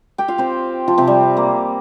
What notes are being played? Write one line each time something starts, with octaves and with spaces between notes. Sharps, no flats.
G4 G5
F4 F5
C4 C5
F3 F4
C3 C4
G3
A#3